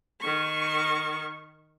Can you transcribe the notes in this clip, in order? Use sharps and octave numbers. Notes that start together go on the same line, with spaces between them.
D#3 C#6